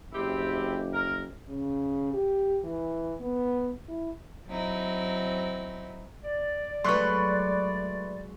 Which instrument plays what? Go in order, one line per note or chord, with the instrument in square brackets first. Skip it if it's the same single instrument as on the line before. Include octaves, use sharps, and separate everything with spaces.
[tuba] F#1 [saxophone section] C4 E4 G4
[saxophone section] A#4
[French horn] C#3
G4
E3
B3
E4
[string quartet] F#3 C4 D#4 E4
[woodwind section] D5
[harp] F#3 G#3 [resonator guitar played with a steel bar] A3 B4 [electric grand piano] C6 C#6 F#6